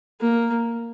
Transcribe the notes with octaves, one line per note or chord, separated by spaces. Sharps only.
A#3